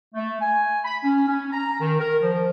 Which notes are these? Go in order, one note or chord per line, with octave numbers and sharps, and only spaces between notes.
A3
G#5
B5
C#4
C#4
A#5
D#3
A#4
F3